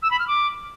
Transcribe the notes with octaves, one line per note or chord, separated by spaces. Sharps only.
E6
B5
F6
D6